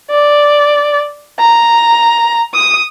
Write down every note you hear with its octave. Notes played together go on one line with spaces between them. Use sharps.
D5
A#5
D#6